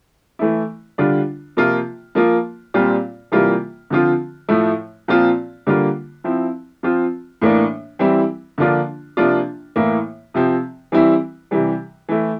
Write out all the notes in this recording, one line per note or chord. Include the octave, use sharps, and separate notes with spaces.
E3 A3 E4
D3 G3 D4 F4
C3 F3 A#3 F4
F3 A#3 F4
A#2 G3 C4 F4
C3 E3 G3 A#3 F4
D3 F3 C4 F4
A2 F3 A3 E4
A#2 F3 C4 F4
D3 G3 A#3 F4
F3 C4 E4
F3 C4 F4
A2 E3 A#3 D4
E3 G3 C4 E4
D3 F3 A#3 D4 F4
C3 F3 A#3 D4 F4
A2 E3 A#3 E4
C3 F3 C4
E3 G3 C4 E4
C3 E3 G3
E3 A3 E4